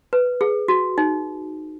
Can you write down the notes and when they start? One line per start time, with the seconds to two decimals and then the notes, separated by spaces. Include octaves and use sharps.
0.13 B4
0.41 G#4
0.68 F#4
0.98 D#4